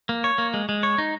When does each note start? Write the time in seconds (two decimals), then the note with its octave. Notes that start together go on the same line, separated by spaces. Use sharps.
0.09 A#3
0.24 C#5
0.38 A#3
0.54 G#3
0.69 G#3
0.83 C#5
0.98 D#4